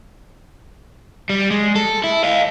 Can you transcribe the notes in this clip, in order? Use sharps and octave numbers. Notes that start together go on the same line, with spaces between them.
G3
G#3
A4
E4
D#5 F5